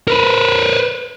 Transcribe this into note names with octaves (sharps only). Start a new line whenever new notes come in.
A#4 B4